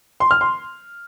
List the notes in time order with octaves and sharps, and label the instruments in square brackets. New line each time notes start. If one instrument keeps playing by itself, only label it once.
[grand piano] C6
F6
C6